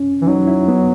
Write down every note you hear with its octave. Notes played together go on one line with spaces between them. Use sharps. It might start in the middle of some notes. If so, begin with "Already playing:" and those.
Already playing: C#4
E3
F#3 D#4
E4
B3